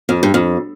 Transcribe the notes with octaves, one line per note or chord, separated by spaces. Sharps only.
F2
G2
F2